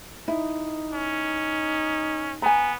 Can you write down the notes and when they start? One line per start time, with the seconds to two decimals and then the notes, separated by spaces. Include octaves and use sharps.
0.28 D#4 E4
0.93 C#4
2.42 B3 G#5 A#5